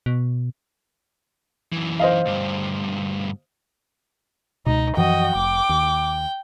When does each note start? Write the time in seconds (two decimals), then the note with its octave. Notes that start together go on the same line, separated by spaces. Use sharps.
0.06 B2
1.72 F#2 E3
2.00 C5 D#5 F5
2.26 D2 G2
4.66 C#2 B2 D#4
4.97 F#2 E3 F3 F#4 D#5 G5
5.35 F1 D6
5.69 D#2